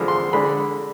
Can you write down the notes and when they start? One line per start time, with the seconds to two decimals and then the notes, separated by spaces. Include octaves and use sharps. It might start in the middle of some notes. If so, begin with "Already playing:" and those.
Already playing: D3 F3 G#3 B5
0.08 C6
0.33 D3 G#3 D4 B5